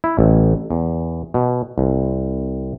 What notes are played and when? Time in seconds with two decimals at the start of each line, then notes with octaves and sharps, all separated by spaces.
0.04 E4
0.19 A1
0.71 E2
1.34 B2
1.78 C2